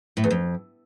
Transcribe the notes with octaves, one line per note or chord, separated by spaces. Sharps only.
A2
E2
F2